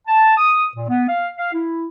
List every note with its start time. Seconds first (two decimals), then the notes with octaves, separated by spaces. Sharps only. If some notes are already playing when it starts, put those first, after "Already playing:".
0.07 A5
0.38 D#6
0.75 A#2
0.88 B3
1.09 F5
1.37 F5
1.53 E4